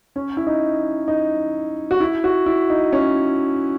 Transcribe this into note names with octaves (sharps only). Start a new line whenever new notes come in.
C#4
E4
D#4
D#4
F#4
E4
F#4
E4
D#4
C#4